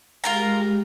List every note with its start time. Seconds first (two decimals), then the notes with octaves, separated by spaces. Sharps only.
0.24 G#3 F4 G4 A#4 A#5